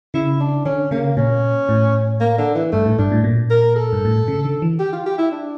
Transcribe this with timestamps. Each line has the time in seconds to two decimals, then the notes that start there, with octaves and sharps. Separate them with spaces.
0.14 C#3 E4
0.40 D4
0.65 D3 C#4
0.91 C#3 A#3
1.17 A#2 C#4
1.69 A2
2.20 A#3
2.38 D3
2.55 E3
2.72 G2 A3
2.85 A2
2.98 G2 D4
3.12 A2
3.24 A#2
3.50 A#4
3.76 A4
3.93 G2
4.05 A2
4.16 A#2
4.28 C#3
4.45 D3
4.62 E3
4.79 G4
4.93 F4
5.06 G4
5.18 E4
5.31 D4